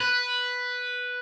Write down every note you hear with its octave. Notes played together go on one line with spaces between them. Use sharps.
B4